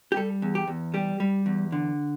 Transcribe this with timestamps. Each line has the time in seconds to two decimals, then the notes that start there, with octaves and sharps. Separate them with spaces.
0.12 G4
0.16 G3 A4
0.42 E2
0.55 G4
0.68 E2
0.94 G3 G4
1.20 G3
1.46 E2
1.72 D3